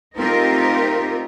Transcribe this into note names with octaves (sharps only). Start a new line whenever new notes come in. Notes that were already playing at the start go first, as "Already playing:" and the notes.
A3 C4 D#4 F4 G4 A#4